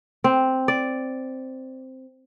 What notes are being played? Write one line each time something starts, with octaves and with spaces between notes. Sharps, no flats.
C4
D5